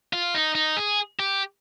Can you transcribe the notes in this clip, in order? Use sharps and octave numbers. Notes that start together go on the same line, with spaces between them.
F4
D#4
D#4
G#4
G4